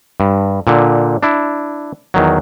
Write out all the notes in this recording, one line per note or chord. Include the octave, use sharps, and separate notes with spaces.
G2
A#2 D3
D4 E4
E2 D#3 F#3